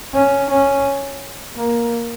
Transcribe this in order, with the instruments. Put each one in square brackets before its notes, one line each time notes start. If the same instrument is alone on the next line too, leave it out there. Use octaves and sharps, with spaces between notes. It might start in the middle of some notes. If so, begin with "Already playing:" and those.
[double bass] C#4
C#4
A#3